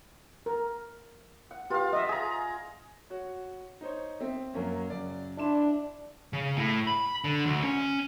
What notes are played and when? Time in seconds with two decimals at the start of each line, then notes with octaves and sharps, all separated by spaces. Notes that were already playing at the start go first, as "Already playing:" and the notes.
0.46 A#4
1.51 F#5
1.70 F4 G4 B4 F5
1.93 D#5 E5
2.09 G#4 A#5
3.10 F#4 C#5
3.81 D#4 C5 C#5
4.20 C4 E5
4.54 F#2 A#3 C#4
4.90 F#2 C#3 D5
5.38 D4 E4 C6 E7
6.33 C#3
6.57 A2
6.87 B5
7.24 D3
7.46 D2
7.63 C#4